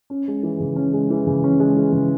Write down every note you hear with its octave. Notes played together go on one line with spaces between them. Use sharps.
C#4
G#3
E3
C#3
C#4
G#3
E3
C#3
C#4
G#3
E3
C#3